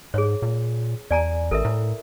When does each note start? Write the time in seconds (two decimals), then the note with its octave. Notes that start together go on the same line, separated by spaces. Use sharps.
0.14 G#2 G#4 C#5
0.42 A#2
1.11 E2 D5 G#5 A#5
1.51 A1 A4 A#4 E5
1.65 A2 E4